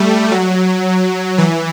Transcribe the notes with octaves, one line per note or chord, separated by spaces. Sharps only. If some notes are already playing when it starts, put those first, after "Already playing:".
Already playing: G3 A3
F#3
E3